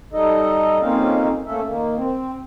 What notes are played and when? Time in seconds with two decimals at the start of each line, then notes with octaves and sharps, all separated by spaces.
0.13 G3 D#4 A4 D#5
0.81 F2 A#3 C4 C#4 D#4 F5
1.46 A3 A#3 C#4 A4 E5
1.67 D#3 A#3
1.96 C4